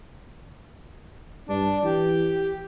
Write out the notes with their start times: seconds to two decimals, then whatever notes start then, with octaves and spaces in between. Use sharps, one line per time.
1.49 G2 D4
1.83 E3 G4